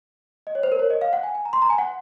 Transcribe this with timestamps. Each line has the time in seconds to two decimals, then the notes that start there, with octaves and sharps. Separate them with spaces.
0.47 D#5
0.55 C#5
0.63 C5
0.72 A#4
0.79 C#5
0.90 D#5
1.01 F5
1.13 F#5
1.23 G#5
1.35 G#5
1.45 A#5
1.53 C6
1.62 A#5
1.70 G#5
1.78 F#5